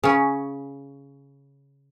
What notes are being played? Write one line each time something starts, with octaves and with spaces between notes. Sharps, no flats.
C#3 C#4